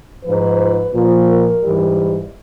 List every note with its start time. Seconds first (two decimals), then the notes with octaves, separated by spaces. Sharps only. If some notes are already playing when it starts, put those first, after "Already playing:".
0.25 G#2 F3 B4
0.93 A#2 F3
1.28 A#4
1.62 G#2 E3 G3